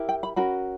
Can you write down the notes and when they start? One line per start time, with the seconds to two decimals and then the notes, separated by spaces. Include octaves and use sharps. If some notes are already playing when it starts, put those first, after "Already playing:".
Already playing: E4 G4 A#4
0.09 G5
0.23 B5
0.36 C#4 F#4 A#4 B5